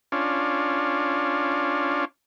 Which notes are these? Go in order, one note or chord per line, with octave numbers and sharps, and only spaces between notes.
C#4 D4 F4